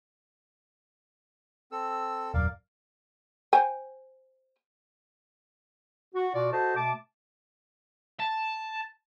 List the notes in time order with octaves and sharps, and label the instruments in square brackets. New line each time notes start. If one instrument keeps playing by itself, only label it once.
[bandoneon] C4 A4 E6
[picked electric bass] D#1 F#2 [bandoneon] A#4 D5 F5
[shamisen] C5 G5 G#5
[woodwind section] F#4
B2 F4 F#4 D5
F#4 A4 C5 D#5 A5
B2 A3 A5 D6
[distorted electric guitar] A5